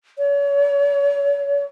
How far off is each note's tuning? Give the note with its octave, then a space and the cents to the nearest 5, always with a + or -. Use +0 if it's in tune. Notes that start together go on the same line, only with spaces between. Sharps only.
C#5 +35